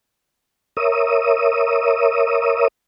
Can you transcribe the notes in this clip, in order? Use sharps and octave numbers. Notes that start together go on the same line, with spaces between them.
A#4 C#5 E5 D#6